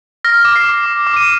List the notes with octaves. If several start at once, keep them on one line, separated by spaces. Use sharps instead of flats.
F6 A#6
D6
C7
D6
D6
D6
D#7